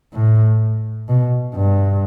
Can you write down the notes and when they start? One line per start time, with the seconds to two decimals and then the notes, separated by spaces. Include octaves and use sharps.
0.14 A2
1.09 B2
1.56 G2